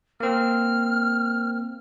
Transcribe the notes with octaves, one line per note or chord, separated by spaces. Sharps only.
A#3 C4 F6